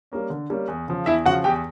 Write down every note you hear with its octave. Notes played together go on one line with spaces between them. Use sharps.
G3 A#3 C#4
D3
G3 A#3 C#4
E2
C#3 F3
E2 E4 E5
C#3 F3 F#4 F#5
E2 G4 G5